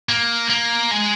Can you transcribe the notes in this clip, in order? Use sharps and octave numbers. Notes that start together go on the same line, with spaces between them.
A#3
A#3
G#3